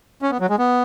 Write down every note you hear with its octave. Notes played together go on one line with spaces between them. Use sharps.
C#4
B3
F#3
G#3
B3